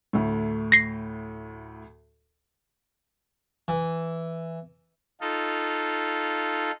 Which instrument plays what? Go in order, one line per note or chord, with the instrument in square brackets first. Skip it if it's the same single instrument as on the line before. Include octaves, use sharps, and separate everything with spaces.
[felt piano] D2 A2
[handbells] A#6 C7
[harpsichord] E3
[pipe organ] D#4 F4 A4